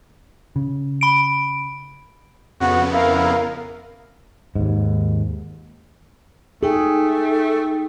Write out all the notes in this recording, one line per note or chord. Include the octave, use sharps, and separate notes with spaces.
C#3
B5 D7
F2 C#3 B3 F#4
E4 A#4 F5
D#2 G#2
A3 D#4 G#4 G5